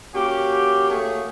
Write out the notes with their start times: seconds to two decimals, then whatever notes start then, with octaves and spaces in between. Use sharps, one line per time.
0.15 A#3 C#4 F#4 G4
0.90 A3 A#3 F#4 G#4 C#5 F5